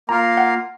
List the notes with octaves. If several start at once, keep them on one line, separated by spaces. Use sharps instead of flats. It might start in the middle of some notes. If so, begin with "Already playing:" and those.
A#3 F4 A#4 F5 A#5
F#5